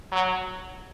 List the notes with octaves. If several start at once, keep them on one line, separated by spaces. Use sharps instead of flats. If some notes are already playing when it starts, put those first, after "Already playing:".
F#3